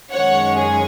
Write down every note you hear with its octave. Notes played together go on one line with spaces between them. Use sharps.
F#2 D#3 G#3 C#4 C#5 F#5
G#4 C#5